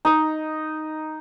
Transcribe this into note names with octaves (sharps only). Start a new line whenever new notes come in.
D#4 D#5